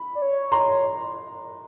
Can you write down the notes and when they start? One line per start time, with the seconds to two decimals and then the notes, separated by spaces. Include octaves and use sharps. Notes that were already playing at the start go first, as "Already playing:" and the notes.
Already playing: B5
0.15 D5
0.22 C#5
0.52 A#5 C6